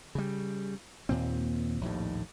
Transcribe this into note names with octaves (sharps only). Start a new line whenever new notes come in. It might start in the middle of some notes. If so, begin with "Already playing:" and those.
C#3 G3
D#2 A#2 C4
A#1 D#2 A2